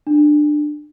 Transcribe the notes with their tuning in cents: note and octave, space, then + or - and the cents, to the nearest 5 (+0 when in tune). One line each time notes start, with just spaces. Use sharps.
D4 +20